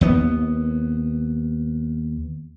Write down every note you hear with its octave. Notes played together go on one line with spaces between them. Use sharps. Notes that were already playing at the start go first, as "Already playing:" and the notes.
D#2 B3